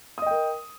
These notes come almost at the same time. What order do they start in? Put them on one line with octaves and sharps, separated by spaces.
D#6 D#5 G5 A#4